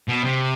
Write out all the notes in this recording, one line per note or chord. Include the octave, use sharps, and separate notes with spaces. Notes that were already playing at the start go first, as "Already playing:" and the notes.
B2
C3